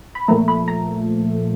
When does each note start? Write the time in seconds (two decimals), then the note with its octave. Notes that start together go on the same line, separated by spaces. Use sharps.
0.15 B5
0.28 A#2 F3 A3 A#5
0.48 B5
0.68 A#5